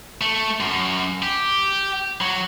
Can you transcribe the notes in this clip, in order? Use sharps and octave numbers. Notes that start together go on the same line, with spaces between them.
A3
F#2
G4
F#3